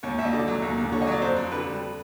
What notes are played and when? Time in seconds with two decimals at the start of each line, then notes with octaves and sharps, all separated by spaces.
0.03 D#2 C#5
0.18 D#2 E5
0.25 D#5
0.33 D3 D5
0.48 F#3
0.62 D#2
0.78 D#2
0.92 D3 C#5
1.02 D#5
1.07 F#3
1.12 D5
1.22 F2 C5
1.37 F2
1.52 D3 B4
1.67 G3